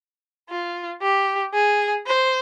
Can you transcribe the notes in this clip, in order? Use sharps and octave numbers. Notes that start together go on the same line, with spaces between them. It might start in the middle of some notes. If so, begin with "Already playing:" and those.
F4
G4
G#4
C5